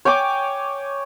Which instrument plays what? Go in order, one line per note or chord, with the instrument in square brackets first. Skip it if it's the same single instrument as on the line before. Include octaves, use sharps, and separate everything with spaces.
[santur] C#5 G5 G#5 D6